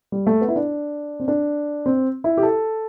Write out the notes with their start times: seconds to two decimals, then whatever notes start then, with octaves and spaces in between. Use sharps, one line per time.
0.12 G3
0.27 A3
0.41 B3
0.48 E4
0.56 D4
1.20 C4
1.28 D4
1.86 C4
2.24 E4
2.37 G4
2.43 A4